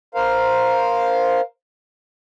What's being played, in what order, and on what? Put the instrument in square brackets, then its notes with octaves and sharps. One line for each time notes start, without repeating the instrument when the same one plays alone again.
[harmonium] A#4 C5 F5